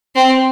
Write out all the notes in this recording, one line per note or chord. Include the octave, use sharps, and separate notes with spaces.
C4